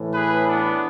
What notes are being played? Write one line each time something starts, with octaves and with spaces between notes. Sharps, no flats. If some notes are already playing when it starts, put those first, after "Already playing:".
Already playing: A2 E3
G#4 B4
B3 D4